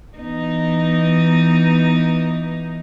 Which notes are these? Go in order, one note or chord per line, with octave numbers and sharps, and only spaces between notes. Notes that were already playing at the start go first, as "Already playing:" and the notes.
E3 B3 D#4